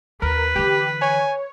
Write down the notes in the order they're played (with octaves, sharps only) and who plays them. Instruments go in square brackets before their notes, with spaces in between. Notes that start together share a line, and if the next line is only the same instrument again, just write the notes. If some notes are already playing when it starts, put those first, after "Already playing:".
[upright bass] D#2 [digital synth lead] A#4 [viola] B4
[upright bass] D3 E3 [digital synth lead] G4
[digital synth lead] C#5 [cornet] G#5